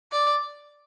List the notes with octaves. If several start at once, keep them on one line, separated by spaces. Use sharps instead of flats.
D5